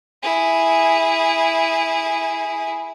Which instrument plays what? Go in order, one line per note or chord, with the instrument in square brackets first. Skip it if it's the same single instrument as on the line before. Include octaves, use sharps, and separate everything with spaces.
[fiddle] E4 G#4